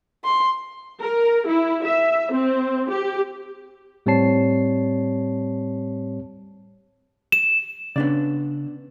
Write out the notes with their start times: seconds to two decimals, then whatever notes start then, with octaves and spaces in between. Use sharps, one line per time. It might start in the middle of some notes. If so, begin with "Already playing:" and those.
0.24 C6
1.01 A#4
1.47 E4
1.85 E5
2.32 C4
2.90 G4
4.06 A2 G3 C4 C#5 A5 C7
7.32 E7
7.96 C#3 B3 D4 D5